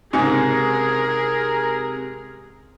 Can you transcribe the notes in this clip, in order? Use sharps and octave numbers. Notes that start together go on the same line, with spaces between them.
C#2 G#2 C3 G#4 A#4